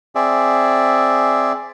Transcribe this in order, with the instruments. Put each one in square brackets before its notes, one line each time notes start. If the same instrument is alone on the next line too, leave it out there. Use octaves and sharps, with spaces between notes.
[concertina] C4 G#4 D5 E5